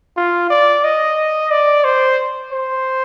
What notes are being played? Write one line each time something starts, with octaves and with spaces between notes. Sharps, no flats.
F4
D5
D#5
D5
C5
C5